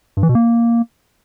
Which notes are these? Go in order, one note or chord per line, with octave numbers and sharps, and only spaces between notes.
G2
E3
B2
A#3